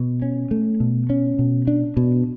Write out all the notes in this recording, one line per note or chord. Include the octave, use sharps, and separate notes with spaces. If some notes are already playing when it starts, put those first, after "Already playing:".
Already playing: B2
C#4
A3
B2
C#4
B2
D4
B2